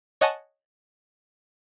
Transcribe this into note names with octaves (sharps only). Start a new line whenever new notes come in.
C#5 D#5 F#5 G#5 A5 C#6